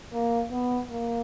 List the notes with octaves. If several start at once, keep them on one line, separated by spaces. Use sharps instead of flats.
A#3
B3
A#3